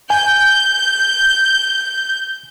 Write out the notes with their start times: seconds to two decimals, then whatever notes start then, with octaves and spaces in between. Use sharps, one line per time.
0.10 G#5 G6